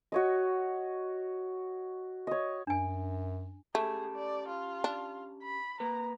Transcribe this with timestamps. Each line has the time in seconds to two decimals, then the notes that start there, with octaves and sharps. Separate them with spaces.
0.12 F#4 C#5 D#5
2.27 C#5 D#5
2.67 F#2 D4 G#5
3.75 A3 C#4 G4 G#4 A5
4.15 D5
4.48 F4
4.84 D4
5.43 B5
5.80 A#3 B4 A#5